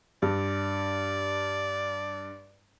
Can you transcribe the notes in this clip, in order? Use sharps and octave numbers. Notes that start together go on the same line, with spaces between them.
G2 D5